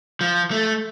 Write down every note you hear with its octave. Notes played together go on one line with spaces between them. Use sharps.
F3
A3